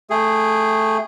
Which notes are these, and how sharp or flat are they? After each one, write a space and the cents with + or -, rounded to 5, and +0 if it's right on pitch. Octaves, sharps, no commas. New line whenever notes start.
A3 +0 G#4 +0 G5 +20